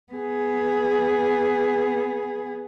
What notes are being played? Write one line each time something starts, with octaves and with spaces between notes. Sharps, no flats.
B3 G#4